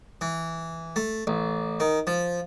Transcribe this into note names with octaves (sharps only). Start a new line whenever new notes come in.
E3
A3
A1
D#3
F3